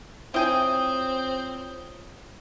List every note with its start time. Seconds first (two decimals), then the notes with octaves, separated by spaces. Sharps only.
0.34 C4 E4 F4 C#5 G5 G#5 D#6